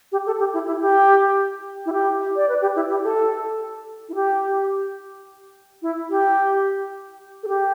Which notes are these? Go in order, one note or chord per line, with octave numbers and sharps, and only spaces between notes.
G4
A4
G4
E4
E4
G4
E4
G4
D5
B4
G4
E4
G4
A4
E4
G4
E4
G4
A4
G4